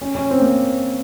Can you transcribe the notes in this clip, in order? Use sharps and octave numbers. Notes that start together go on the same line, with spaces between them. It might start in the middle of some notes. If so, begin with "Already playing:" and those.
C#4
C#4
C4
A#3